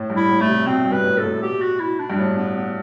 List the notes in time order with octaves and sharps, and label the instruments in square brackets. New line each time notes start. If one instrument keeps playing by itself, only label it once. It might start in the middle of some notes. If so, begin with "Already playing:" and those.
Already playing: [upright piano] A2
G2
[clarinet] E4
[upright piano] A2
[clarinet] A3
[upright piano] C3
[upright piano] B2 [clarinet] C4
[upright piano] G2
[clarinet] B4
[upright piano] A2
[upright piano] G2 [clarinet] A4
[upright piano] A2
[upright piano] B2 [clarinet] G4
[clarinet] F#4
E4
D4
[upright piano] G2
[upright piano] A2 [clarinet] D4
[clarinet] B3
B3